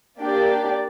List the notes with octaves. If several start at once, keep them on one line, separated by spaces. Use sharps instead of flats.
A#3 D4 G4 D5